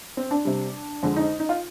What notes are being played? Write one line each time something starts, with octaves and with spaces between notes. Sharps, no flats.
C4
D4
C3 G3
F2 D3 G#3
D#4
D#4
F4